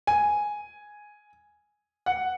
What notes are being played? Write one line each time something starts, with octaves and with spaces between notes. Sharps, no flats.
G#5
F#5